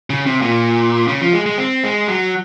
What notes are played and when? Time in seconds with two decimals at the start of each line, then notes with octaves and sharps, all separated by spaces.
0.10 C#3
0.26 C3
0.42 A#2
1.08 C#3
1.21 F3
1.33 G#3
1.46 G#3
1.58 C4
1.84 G#3
2.08 F#3